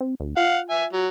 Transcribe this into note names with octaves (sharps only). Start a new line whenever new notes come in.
C4
D2
F4 F5 F#5
E5 G#5
F#3